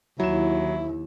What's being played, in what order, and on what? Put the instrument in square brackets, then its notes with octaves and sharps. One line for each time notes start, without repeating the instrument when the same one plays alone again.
[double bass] D#2 [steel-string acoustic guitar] E3 [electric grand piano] F#3 E7 [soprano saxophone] E4